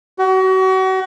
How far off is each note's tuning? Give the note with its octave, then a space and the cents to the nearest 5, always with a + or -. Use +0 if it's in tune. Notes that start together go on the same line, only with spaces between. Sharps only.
F#4 +35